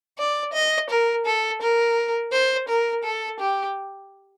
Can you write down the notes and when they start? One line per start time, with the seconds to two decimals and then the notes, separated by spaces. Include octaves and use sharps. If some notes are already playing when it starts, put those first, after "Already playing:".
0.18 D5
0.53 D#5
0.90 A#4
1.26 A4
1.61 A#4
2.32 C5
2.68 A#4
3.04 A4
3.40 G4